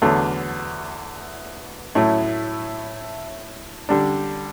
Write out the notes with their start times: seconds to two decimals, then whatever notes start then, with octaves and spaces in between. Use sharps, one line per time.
0.02 E2 D3 F#3 A3
1.95 A2 F#3 A3 E4
3.89 D3 G3 D4